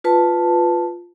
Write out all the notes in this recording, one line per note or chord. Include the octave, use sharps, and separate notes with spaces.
F4 B4 A5